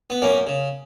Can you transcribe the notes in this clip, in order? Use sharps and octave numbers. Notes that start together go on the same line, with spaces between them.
B3
F#2 A#3 C#4
C#3